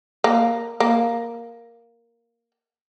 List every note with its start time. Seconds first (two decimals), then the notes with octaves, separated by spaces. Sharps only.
0.24 A#3
0.80 A#3